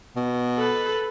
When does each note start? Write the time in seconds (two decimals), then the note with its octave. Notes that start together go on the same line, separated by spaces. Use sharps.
0.16 B2
0.57 A4 B4